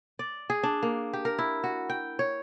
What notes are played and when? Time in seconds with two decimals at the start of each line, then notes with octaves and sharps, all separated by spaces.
0.19 D5
0.50 G#4
0.63 D4
0.83 A#3
1.13 G4
1.25 A#4
1.39 E4
1.64 F#4
1.90 G5
2.19 C#5